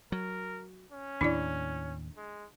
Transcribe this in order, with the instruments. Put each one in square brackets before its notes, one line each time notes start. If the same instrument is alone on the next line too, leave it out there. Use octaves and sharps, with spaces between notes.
[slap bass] F#3 [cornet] A#4
[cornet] C#4
[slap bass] D#2 A2 [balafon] D4 E4 D5
[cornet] G#3